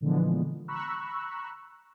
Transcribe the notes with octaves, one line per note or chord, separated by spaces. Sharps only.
A#2 D3 E3 F3 G#3 B3
A#5 B5 C#6 E6 F#6